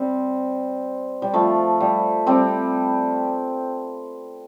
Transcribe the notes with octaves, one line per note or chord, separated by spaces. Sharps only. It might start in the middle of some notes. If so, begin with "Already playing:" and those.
Already playing: G3 C4
G3
F3 A3
G3
G3 C4